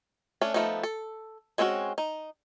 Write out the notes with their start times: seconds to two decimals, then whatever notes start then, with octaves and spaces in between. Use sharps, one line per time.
0.41 A3 C#4 D4
0.54 F3 A3 B3 D#4
0.83 A4
1.58 G#3 C4 C#4 E4 F#4
1.98 D#4